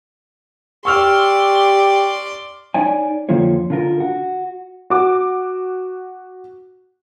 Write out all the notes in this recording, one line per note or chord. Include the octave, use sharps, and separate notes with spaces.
G4 D5 C6 C#6 E6 F6
D#4 C#5 D5 G#5
F2 D3 F3 A#3 F4 C#5
D3 F4 A#4
F#4
F#4 D6